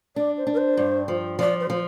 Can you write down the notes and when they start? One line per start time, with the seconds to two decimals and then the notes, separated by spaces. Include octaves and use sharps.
0.16 D4 D5
0.37 C5
0.47 D4
0.53 A#4
0.57 C5
0.77 G2
1.08 F3
1.39 F3 D5
1.60 C5
1.70 F3